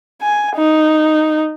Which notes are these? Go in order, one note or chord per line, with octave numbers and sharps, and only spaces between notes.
G#5
D#4